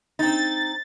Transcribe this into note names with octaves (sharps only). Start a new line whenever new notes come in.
C4 D#4 A6